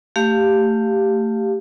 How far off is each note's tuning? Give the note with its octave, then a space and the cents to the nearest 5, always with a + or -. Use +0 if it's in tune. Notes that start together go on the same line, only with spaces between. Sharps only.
A3 +20 G4 +0 F5 +0